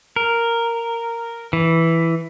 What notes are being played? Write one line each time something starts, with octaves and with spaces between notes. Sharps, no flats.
A#4
E3